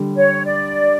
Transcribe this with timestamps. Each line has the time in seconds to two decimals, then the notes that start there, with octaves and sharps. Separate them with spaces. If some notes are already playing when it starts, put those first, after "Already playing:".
Already playing: D3 G3
0.16 C#5
0.45 D5